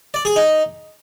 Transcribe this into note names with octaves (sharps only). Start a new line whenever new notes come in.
D5
G#4
D#4